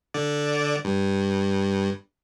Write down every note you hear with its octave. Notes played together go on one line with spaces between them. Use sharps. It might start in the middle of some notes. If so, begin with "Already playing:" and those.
D3 D5
G2